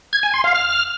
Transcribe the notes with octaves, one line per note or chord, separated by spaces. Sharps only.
G#6
G#5
C6
F5
F6